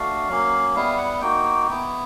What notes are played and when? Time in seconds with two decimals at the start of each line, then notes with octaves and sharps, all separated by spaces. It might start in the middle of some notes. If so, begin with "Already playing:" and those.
Already playing: A3 D4 F#4 F5
0.29 F#3 A#3 C#4
0.75 G3 B3 E4 F5
0.98 F#5
1.21 A#3 D#4 F#4 G5
1.67 B3 E4 G5